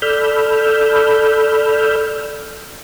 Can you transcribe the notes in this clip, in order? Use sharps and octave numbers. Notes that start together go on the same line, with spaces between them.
A4 D5 B5 E6 F6 G6